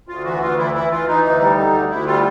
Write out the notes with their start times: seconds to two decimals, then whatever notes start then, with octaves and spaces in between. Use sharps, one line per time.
0.08 D2 F4
0.24 E3 F#4
0.41 D2 F4
0.58 E3 E4
0.74 E3 E4
0.90 E3 F4
1.07 E3 D#4
1.23 D2 D#4
1.40 G3
1.56 D3
1.73 D2
1.89 D2 E4
2.06 G3 F4